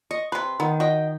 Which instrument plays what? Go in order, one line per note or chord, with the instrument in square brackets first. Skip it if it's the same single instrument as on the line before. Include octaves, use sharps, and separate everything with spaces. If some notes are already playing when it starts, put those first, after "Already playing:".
[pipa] D#5 [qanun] C#6
[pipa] C3 B4 [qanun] C6
[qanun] D#3 [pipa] B3
[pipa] F#4 D#5 [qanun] G5